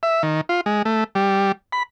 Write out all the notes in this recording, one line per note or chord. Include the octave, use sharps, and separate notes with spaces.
E5
D#3
F4
G#3
A3
G3
B5